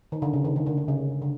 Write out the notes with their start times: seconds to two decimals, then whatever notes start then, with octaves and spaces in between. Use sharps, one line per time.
0.12 D#3
0.22 D3
0.33 C#3
0.45 D#3
0.56 D#3
0.66 D3
0.78 D3
0.88 C#3
1.22 D3